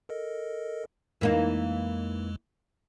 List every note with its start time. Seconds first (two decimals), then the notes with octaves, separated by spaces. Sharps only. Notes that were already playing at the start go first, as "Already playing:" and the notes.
0.09 A4 A#4 D#5
1.21 F2 E3 G#3 A#3 D#4